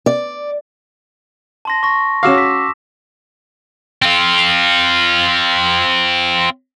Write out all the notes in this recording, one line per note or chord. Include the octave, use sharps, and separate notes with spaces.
D5
A5 C6 A#6
C#6 A#6
C#4 F#4 F5 D6 E6 E7
B6
C4 F4